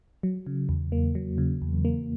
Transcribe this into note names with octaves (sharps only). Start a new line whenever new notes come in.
F#3
C#3
E2
A#3
F#3
C#3
E2
A#3